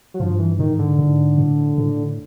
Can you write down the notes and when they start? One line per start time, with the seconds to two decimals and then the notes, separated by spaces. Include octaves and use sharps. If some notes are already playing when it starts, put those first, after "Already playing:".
0.14 F#3
0.20 G2 F3
0.39 E3
0.59 G#2 D#3
0.79 D3
0.99 G#2
1.38 A2
1.78 A2